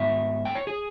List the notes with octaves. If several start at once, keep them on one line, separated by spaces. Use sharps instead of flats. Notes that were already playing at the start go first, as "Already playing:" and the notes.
Already playing: G#2 G3 B3 E5
G5
C#5
G#4